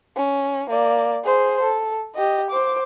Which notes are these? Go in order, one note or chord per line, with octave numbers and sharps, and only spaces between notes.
C#4
A#3 D5
G#4 C5
A4
G4 D#5
C5 D6